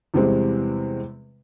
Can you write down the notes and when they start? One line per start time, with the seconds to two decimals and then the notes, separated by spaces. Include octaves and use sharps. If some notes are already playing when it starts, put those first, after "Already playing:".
0.14 E2 C3 G3 G#3 C4